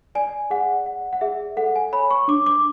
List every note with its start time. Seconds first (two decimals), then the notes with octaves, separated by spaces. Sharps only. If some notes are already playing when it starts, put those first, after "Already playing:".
0.15 D5 G#5
0.50 G#4 F#5
0.86 D5 F#5
1.13 F#5
1.21 G#4 E5
1.57 A4 F#5
1.76 G#5
1.92 C#5 B5
2.11 C#6
2.28 D4 D6
2.46 D6